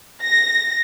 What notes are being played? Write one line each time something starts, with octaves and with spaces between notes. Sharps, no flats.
A#6